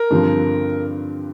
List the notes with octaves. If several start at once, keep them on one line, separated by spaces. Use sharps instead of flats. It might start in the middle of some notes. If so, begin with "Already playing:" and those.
Already playing: A#4
G2 D3 F3 C4